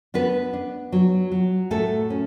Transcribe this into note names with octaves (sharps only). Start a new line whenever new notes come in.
B3 D4 B4
D4
F#3
F#3
A2 A3 A4
C#4